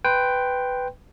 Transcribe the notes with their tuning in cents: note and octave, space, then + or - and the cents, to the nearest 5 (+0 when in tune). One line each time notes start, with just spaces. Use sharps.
B4 +10 G5 +0 C6 +0